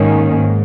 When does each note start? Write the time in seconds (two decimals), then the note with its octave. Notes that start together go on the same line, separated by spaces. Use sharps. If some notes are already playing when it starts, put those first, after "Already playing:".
Already playing: G#2 D#3 A#3 C#4
0.34 G#2